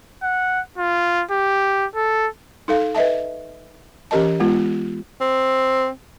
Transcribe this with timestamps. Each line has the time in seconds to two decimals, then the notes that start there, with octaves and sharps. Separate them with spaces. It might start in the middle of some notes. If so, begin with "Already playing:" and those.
0.23 F#5
0.78 F4
1.31 G4
1.96 A4
2.68 D#4 A4 F5
2.95 B4 D#5 E5 A5
4.11 E3 C#4 G4 A#4 D#5 A5
4.40 G#3 B3 F4
5.21 C4